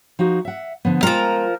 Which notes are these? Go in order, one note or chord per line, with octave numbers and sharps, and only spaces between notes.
F3 D#4 F#4
E5 F#5
D3 F3 B3
F3 G#3 F4 A#4 G5